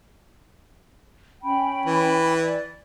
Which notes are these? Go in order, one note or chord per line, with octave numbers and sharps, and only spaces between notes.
C#4 G5 B5
E3
D5